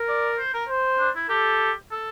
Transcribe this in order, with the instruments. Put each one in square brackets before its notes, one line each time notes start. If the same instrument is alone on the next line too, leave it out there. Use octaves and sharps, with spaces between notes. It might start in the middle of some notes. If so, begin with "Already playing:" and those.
Already playing: [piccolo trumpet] A#4
[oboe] D5
C5
A#4
[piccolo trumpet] C5
[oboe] D4
E4
[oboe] G4 [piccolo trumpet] A4
[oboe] A4